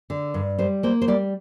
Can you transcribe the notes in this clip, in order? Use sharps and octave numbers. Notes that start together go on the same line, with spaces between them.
D3
G2
G3 C5
A#3 C5
C5
G3 D5